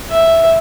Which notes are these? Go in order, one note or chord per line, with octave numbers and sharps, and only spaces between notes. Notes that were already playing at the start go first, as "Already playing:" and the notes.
E5